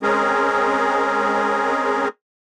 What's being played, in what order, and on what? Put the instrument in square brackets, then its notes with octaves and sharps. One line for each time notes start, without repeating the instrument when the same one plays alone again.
[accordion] G#3 C4 C#4 G#4 A#4